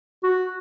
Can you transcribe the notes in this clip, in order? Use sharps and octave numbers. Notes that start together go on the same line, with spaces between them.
F#4